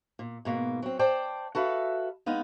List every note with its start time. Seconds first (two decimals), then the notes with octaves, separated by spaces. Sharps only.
0.19 A#2
0.45 G#2 B2 A#3
0.82 F#3 C4
0.99 C5 D5 G5 A5
1.55 F#4 A4 B4 E5 F5
2.26 G#3 B3 D#4 F5